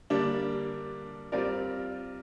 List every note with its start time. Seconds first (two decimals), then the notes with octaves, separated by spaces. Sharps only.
0.10 D3 G3 A#3 D4
1.32 G3 C4 F4 A#4 D5